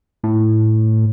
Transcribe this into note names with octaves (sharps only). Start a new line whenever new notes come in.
A2